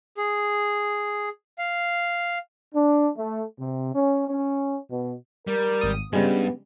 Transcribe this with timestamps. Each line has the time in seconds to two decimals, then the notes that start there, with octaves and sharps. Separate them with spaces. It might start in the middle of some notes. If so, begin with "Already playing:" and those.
0.17 G#4
1.58 F5
2.74 D4
3.18 A3
3.59 C3
3.94 C#4
4.29 C#4
4.90 B2
5.47 G3 A#4
5.81 G#1 D#6
6.13 G2 C#3 G3 G#3 B3